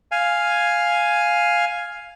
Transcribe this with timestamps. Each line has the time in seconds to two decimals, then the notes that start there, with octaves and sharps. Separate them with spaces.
0.12 F5 G#5